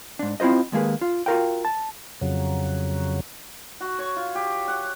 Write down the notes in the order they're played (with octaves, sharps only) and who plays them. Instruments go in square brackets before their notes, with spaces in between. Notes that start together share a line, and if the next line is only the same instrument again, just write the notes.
[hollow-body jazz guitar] G#2 D4
C4 E4 F4 C5 D#5
D#2 G#3 A#3 G#4 B4
F4
F4 F#4 A4 A#4 F5 G5
A5
[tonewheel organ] F2 C#3 F#3
[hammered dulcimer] F#4
C#5
F4
G4
F#5